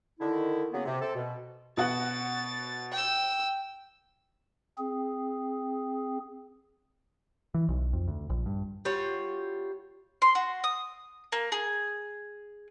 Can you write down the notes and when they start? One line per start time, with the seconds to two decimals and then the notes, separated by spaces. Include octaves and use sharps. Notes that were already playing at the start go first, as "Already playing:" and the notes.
0.20 D3 D#3 E4
0.72 C#3 F#3 A#3 B3
0.85 C3
1.01 C4 A4
1.15 B2
1.77 B2 F#4 F#5 A6
2.92 G5 E6
4.78 C4 G#4
7.54 E3
7.69 B1
7.93 F2
8.08 D2
8.30 A#1
8.46 G2
8.85 G3 F4 F#4 C#5
10.22 C6
10.35 F#4
10.64 D#6
11.32 A#3
11.52 G#4